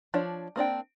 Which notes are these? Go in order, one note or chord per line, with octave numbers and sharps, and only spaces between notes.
F3 D4 C#5 D5
A#3 C4 D4 G5